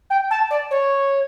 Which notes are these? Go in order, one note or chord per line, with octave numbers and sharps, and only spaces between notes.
G5
A5
D5
C#5